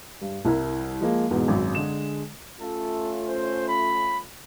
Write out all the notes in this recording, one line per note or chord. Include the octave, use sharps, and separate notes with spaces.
G2
C2 E4 A#4
F3 G#3 A#3
E2 G#2 B2
G#1 F#2
D3 G#3 G#4 E7
A3 C#4 F4 A4
C5
B5